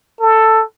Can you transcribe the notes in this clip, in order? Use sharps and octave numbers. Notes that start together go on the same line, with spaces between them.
A4